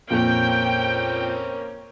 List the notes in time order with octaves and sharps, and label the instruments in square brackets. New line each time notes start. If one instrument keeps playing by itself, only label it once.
[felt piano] F2 A#2 [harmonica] A#3 C4 C#4 [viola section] G5